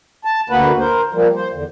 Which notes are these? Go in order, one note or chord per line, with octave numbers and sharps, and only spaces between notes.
A5
D2 A#3 F#4 B4
A#4 C5
F3 G3 A#3
C5
E2 D3